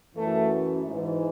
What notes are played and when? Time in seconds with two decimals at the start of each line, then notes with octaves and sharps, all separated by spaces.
0.15 F#2 E3 A3
0.86 G#2 E3